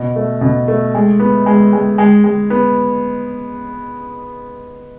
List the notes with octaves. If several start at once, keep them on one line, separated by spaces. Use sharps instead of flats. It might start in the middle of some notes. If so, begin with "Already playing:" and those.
Already playing: B2
A3
B2
A3
G#3
B3
G#3
G#3
G#3
G#3
B3